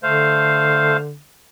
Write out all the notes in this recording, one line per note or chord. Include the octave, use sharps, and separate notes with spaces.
D3 A3 C5 F5